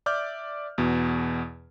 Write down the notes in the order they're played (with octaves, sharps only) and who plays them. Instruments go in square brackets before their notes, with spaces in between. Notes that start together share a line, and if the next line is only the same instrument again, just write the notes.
[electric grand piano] D5 E5 D6 F6 G6
E2 B2